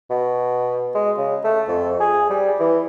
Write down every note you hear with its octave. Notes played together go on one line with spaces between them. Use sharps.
B2
G#3
C#3
A3
F2
G#4
G3
E3